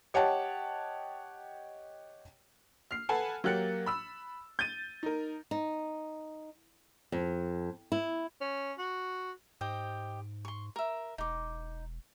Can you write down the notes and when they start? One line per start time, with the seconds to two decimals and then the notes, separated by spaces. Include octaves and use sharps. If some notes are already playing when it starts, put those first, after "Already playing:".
0.14 G4 C#5 D#5 F#5 G5 A5
2.91 F6 C7
3.09 A4 B4 F#5 G#5 A5
3.44 F#3 A#3 G4 F#6 A6 C#7
3.86 B5 E6 E7
4.59 G6 A6 D#7
5.03 D#4 A#4
5.51 D#4
7.12 F2
7.92 E4
8.41 C#4
8.78 F#4
9.61 G#2 G4 C5 D#5
10.45 C6 C#6
10.76 A#4 E5
11.18 E1 D#4 D6